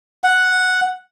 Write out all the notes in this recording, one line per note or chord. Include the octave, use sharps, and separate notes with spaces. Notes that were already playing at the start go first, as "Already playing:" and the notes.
F#5